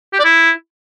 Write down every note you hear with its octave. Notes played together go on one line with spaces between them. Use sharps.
G4
D5
E4